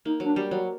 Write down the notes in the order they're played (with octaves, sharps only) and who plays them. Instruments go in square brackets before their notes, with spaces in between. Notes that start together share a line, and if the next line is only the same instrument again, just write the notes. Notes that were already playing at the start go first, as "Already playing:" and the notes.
[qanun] A#3 [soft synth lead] D#4
[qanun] F#3 [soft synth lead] D4
[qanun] G3
F#3